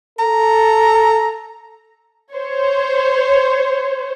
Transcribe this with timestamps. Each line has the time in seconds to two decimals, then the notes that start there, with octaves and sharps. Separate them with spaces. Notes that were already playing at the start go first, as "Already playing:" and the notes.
0.19 A4 A#5
2.33 C5 C#5